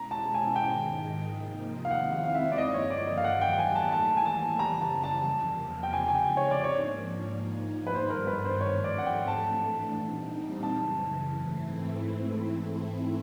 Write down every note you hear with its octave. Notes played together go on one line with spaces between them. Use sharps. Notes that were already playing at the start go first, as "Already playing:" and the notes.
Already playing: B2 G#3 C#4 E4 A#5
A5
G#5
G#2 D#3 G#3 G5
C3 F3 A#3 D#4
F5
D#3 G#3 C4 E4 F#5
F5
F5
E5
D5
G2 D3 F3 A#3 D#5
C#5
D5
D#5
F5
D#3 F#3 A3 F#5
G5
G5
G#5
A5
A2 E3 G3 A#3 A5
G#5
A5
F#2 C#3 E3 G3 A#5
A5
A5
E2 C3 F3 A#3
G5
C#3 F3 G#3 C4 D#4 G#5
G#5
G5
C#5
D5
G#2 F3 A#3 D4 C#5
G#2 F3 A#3 D#4
B4
G2 D#3 G3 B3 D4 C5
A#4
B4
C5
G#2 F3 A3 C4 C#5
D5
F#5
G5
A2 E3 A3 D4 A5
A#2 G3 C4 D#4
F#2 C#3 E3 A5
G#2 E3 A3 C4 E4